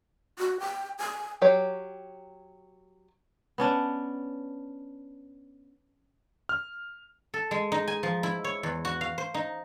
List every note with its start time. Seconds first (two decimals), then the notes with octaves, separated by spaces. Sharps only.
0.39 F#4
0.60 G5
0.99 G#5
1.42 F#3 G4 C#5
3.58 B3 C#4 D4
6.49 F6
7.34 A4
7.51 G#3
7.72 D#4
7.88 G#5
8.03 F3
8.23 E4
8.44 C#5
8.63 E2
8.85 F#4
9.01 F5
9.18 C5
9.34 D#4